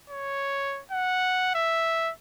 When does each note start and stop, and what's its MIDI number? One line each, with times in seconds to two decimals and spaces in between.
0.10 0.82 73
0.91 1.50 78
1.55 2.12 76